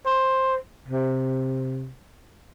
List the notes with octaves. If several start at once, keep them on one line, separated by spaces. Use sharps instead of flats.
C5
C3